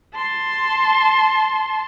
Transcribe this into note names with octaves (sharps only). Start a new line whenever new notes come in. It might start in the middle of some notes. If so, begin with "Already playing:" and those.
A5 C6